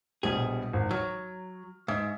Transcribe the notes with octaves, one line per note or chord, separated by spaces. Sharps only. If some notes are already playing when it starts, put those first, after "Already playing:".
A#1 B2 G3 G#4
G#1
F#3 F6
G#2 E5